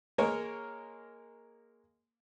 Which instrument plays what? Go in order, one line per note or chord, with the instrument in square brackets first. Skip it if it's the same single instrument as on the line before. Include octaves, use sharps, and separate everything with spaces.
[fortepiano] G#3 A#3 A#4 C#5